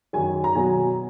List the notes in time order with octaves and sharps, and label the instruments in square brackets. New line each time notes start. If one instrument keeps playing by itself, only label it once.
[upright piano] F#2 D#3 F#3 G#5
A#5
B2 F#3 G#5